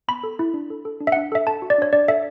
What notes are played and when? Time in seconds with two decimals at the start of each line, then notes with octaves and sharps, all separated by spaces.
0.08 B3 B5
0.24 A4
0.39 E4
0.54 D4
0.70 A4
0.85 A4
1.00 D4
1.07 E5
1.12 F#5
1.16 D4
1.32 A4 E5
1.47 A4 A5
1.62 F#4
1.70 D5
1.78 D4 C#5
1.93 D4 D5
2.08 A4 E5